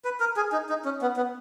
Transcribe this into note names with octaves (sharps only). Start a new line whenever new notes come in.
B4
A#4
G#4
D#4
D#4
C#4
B3
B3